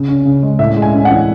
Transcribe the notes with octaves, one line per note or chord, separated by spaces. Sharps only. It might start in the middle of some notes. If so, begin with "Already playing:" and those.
Already playing: C#3
C#4
C#3
G#3
A2 E5
G#3
G#5
C#4
F#5
E3